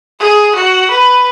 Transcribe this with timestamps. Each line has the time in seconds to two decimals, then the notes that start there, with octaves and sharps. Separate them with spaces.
0.20 G#4
0.56 F#4
0.91 B4